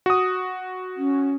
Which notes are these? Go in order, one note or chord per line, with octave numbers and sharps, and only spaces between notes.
F#4 D#6
C#4